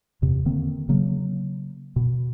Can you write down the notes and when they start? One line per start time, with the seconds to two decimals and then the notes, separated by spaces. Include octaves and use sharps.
0.22 E2 C3
0.45 D3 D#3 A#3 C4
0.89 C#3 F#3 A#3
1.96 B2